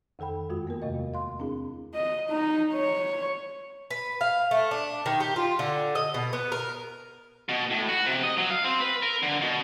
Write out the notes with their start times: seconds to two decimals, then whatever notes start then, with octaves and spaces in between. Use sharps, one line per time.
0.19 F2 D#3 A4 G5 B5
0.49 F#2 G#3 F4 F#4
0.67 A#3 B3 A#4
0.82 E2 C3 A3 D#5
1.14 F5 C6
1.39 C4 D4 E4 G#4
1.94 D#5
2.29 D#4
2.73 C#5
3.91 B4
4.21 F5
4.51 A3
4.71 D4
5.06 D#3
5.20 G4
5.36 F4
5.59 D3
5.95 D#5
6.14 B2
6.33 B3
6.52 A#4
7.49 B2
7.70 A2
7.89 F#4
8.06 C3
8.23 D#5
8.38 F#3
8.51 F5
8.64 C4
8.80 B4
9.02 A#4
9.23 D3
9.41 B2